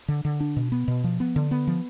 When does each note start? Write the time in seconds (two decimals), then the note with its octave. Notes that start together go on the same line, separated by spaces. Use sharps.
0.08 D3
0.25 D3
0.40 D4
0.57 B2
0.72 B3
0.88 B2
1.04 F3
1.20 B3
1.36 D3
1.51 B3
1.67 F3